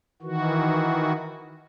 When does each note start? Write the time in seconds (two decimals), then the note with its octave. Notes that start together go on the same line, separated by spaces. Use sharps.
0.22 D#3 E3 F#4